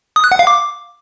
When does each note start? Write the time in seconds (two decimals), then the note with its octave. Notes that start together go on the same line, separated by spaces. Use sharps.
0.16 D#6
0.24 F#6
0.32 F#5
0.39 F5
0.47 D6